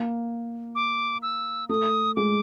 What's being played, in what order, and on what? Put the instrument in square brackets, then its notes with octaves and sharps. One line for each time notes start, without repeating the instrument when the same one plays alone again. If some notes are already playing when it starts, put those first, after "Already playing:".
Already playing: [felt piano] A#3
[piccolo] D6
E6
[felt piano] A3 [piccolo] D#6
[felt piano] G#3 [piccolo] D6